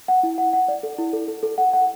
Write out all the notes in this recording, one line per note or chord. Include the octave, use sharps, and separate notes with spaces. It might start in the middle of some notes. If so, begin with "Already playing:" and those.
F#5
E4
F#5
F#5
D5
A4
E4
A4
A4
A4
F#5
F#5